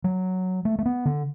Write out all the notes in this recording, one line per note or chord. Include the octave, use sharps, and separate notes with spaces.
F#3
A3
A3
B3
D3